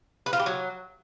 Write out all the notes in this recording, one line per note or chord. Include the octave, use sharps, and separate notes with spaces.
B4
F4
G4
F#3